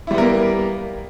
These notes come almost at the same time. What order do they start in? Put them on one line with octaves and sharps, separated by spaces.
E4 G3 B3 A#4 A#3